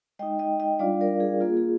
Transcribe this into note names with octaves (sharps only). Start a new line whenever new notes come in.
G#3 D#4 D#5 G5
D#5 G5
D#5 G5
G3 D4 F4 D5 F5
A#4 D5
G#4
A#3 F4 G#4
G#4